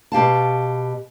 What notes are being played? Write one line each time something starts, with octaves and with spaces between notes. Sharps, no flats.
B2 G4 F5 A5